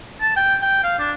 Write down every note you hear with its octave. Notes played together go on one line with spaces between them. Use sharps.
A5
G5
G5
F5
D4